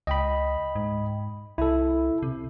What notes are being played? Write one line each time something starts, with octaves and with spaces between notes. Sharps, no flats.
C#2 D#5 G5 B5
G#2
C2 E4 A4
C3